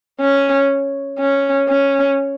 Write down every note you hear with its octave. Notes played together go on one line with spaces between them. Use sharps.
C#4
C#4
C#4